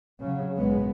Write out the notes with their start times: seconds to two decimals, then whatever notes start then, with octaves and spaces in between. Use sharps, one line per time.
0.21 C#3 F#3
0.57 A#1 G#2 G#3 B3